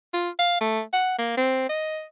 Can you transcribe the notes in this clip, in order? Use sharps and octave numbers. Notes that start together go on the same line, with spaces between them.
F4
F5
A3
F#5
A#3
C4
D#5